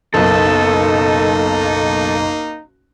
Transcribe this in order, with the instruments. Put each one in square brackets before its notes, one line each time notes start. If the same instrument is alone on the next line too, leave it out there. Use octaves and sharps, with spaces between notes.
[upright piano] F#1 B1 [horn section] A#3 D#4 [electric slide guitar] A4